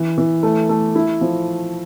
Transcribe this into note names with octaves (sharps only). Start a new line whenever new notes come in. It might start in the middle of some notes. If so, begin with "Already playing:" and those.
Already playing: E3
E3
A3
A3
E4
F3